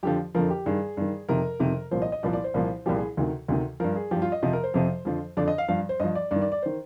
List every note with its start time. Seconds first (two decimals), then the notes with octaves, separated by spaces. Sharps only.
0.03 F2 D3 F3 G4
0.35 F2 D3 F3 A#4
0.50 G4
0.66 G2 D#3 G#4
0.97 G2 D#3
1.28 F2 C3 D#3 A#4
1.60 F2 C3 D#3
1.91 C2 A#2 F3 C5
2.02 D#5
2.12 D#5
2.23 C2 A#2 F3 D5
2.33 D5
2.44 C5
2.54 C2 A#2 F3
2.86 C2 A#2 F3 G4
2.96 G#4
3.17 D2 C3 D#3
3.48 D2 C3 D#3
3.80 G2 F3 A#4
3.96 G#4
4.11 G2 F3 G4
4.22 F4
4.32 D#5
4.43 F2 C3 F3 D#5
4.53 A#4
4.63 C5
4.74 F2 C3 F3
5.05 F2 D3 F3
5.37 F2 D3 F3 D5
5.48 D#5
5.58 F5
5.68 G2 F3 F5
5.89 C5
6.00 G2 F3 D#5
6.15 D5
6.31 G2 D#3 D5
6.41 D5
6.52 D5
6.63 D#3 C5